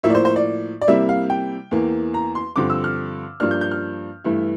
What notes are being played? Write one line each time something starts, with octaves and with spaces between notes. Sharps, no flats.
A2 F3 A#3 E4 E5
D5
C5
C5
D5
D5
C3 G3 A#3 E4 E5
F5
G5
E2 E3 A#3
A#5
C6
G2 D3 F3 C4 D6
E6
F6
G2 F3 A#3 D4 F6
G6
G6
F6
G2 E3 A3 E4